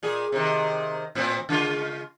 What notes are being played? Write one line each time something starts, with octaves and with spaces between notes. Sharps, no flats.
A#2 G#4
C3 D#3
A2 C4
C#3 G#3 F4